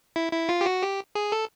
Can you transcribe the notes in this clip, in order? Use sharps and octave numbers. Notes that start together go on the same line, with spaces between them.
E4
E4
F4
G4
F#4
G4
G#4
A4